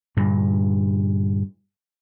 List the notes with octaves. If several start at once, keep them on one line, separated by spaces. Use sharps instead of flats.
G2 A#2 D3